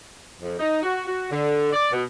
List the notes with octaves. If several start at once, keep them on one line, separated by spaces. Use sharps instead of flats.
F2
D#4
F#4
F#4
D3
D5
B2